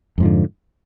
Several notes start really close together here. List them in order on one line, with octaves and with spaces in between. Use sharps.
F2 G#2 F3 D3